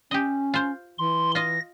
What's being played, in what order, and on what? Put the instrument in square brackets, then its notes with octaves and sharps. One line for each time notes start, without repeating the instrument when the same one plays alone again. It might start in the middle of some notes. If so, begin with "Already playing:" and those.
[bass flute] C#4 [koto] G4 D#5
[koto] F4 C5
[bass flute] E3 [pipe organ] C6
[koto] F4 D#5 [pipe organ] A#6